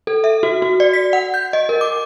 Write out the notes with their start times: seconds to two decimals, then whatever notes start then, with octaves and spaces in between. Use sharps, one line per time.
0.07 A4
0.24 E5
0.43 F#4
0.62 F#4
0.80 D5
0.93 B6
1.13 F#5
1.34 G6
1.53 D#5
1.69 A#4
1.81 D6